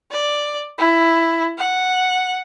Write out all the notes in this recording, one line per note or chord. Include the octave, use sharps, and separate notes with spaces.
D5
E4
F#5